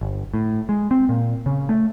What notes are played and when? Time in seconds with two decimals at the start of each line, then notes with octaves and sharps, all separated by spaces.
0.01 G1
0.34 A2
0.69 G#3
0.91 C4
1.09 A#2
1.46 C#3
1.69 A3